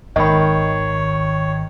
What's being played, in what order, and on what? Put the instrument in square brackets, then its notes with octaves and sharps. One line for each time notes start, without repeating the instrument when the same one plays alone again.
[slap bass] G#1 [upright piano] D#3 [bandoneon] C#5 [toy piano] D#5 B5